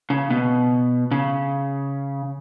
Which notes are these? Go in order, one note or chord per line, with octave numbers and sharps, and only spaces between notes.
C#3
B2
C#3